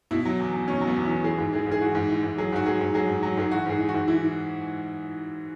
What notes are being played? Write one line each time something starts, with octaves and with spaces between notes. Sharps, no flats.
B2 E4
F#3
E2
E2
B2 C#4
F#3
B3
E2
E4
E2
E3 G#4
G#2
E3 G#4
G#2
G#4
E3 F#4
G#2
E3
G#2
F#3 G#4
G#2 F#4
F#3 G#4
G#2
F#3 G#4
G#2
F#3
G#2 G#4
E3 F#4
G#2 G#4
E3
F#4
G#2
E3 E4